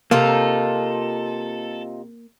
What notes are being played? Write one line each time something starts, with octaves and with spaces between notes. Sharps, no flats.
C3 A#3 D#4 F4 A4